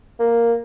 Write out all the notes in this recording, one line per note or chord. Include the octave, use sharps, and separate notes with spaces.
A#3